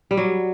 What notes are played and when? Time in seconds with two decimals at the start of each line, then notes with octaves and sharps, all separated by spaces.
0.11 G3
0.17 F#3